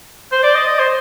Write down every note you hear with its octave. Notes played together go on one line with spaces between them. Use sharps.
C5
D5
D#5
D#5
C5